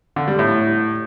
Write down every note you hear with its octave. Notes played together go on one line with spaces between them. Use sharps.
D3
G3
A2